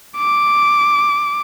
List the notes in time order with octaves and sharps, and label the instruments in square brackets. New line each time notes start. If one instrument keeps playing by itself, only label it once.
[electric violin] D6